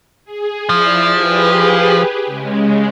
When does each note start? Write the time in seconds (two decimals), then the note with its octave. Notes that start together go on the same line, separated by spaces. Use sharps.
0.25 G#4
0.69 F3 E4 D5
1.11 G4 G#4 B4
2.26 C#3 G#3